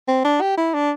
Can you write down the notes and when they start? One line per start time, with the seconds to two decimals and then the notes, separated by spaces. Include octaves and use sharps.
0.08 C4
0.25 D4
0.41 G4
0.57 E4
0.74 D4